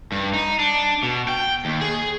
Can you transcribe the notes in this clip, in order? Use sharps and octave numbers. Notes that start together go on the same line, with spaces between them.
G2
D#4
D4
B2
G5
D#2
G#4